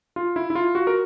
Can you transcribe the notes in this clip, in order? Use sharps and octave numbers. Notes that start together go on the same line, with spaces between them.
F4
E4
E4
F4
F#4
A#4